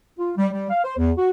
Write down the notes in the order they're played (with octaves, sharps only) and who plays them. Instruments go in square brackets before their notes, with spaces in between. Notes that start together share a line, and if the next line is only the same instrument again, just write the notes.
[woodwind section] F4
G3
G3
F5
C5
E2
F#4